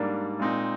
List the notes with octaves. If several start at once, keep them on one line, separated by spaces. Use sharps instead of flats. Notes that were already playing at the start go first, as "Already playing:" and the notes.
Already playing: G#2 G3 A#3 D4
A#2 G#3 C4 D#4